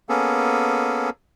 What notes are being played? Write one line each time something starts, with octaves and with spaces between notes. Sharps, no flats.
A#3 B3 C#4 G#4 A4